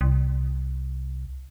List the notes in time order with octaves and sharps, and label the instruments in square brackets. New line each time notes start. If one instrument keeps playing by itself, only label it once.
[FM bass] C2